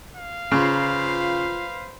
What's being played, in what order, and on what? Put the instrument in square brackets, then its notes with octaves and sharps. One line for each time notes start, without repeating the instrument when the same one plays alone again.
[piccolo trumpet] F5
[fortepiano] C#3 [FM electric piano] F4 A#5 [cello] B4 C5